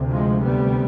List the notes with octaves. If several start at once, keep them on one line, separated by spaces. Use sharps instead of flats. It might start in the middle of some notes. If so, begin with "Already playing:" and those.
Already playing: D2 C3
F3 G#3
G3 B3